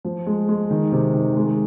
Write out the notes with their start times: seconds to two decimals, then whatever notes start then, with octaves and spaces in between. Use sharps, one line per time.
0.05 F3
0.26 G#3
0.48 G#3
0.70 D#3
0.92 C3
1.14 D#3
1.37 G#3